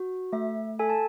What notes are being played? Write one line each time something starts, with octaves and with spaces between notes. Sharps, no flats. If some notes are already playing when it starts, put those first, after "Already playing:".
Already playing: F#4
A3 E5
A4 G#5
A5